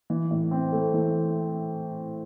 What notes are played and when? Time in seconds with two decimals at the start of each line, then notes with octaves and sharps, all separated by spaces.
0.10 E3
0.31 A2
0.51 C4
0.72 A3
0.93 E3